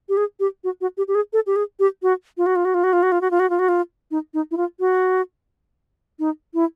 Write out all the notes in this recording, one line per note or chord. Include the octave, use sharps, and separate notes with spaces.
G4
G#4
G4
F#4
F#4
G4
G4
G#4
A4
G4
G#4
G4
F#4
F4
F#4
F4
F#4
F4
F#4
F4
F#4
F4
F#4
F4
F#4
F4
F#4
F4
D#4
D#4
E4
F4
F#4
D#4
E4